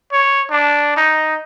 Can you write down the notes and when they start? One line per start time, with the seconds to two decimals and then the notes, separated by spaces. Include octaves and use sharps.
0.12 C#5
0.50 D4
0.97 D#4